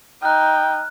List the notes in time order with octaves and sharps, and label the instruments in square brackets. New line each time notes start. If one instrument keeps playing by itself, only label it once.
[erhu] D#4 [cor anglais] G5 [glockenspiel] F6 F#6